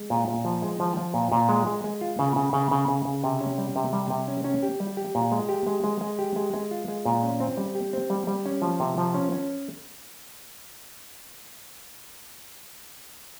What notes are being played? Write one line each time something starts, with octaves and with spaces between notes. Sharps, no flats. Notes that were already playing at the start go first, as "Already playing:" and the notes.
Already playing: G#3
A#2
A#2
F3
G#3
F3
F3
A#2
A#2
G#3
G#3
G#3
F4
C#3
C#3
C#3
C#3
C#3
C#3
C3
C#4
G3
C3
G3
C3
C#4
C#4
G4
G3
G4
A#2
G#3
G4
G#3
G#3
G#3
G4
G#3
G#3
F4
G#3
A#2
C#4
C4
G3
G4
C4
G3
G3
C#4
F3
C3
F3
C#4
C#4